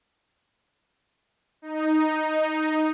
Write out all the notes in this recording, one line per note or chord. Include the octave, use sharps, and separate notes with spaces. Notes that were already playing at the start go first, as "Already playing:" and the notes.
D#4